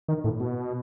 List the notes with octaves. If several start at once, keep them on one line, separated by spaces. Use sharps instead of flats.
D#3
A2
B2